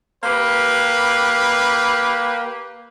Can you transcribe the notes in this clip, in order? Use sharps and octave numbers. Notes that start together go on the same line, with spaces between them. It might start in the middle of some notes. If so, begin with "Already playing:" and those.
A#3 G4 B4